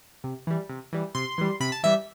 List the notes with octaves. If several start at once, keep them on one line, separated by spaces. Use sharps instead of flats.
C3
E3 G3
C3
E3 G3
C3 C6
E3 G3
C3 B5
A5
E3 G3 E5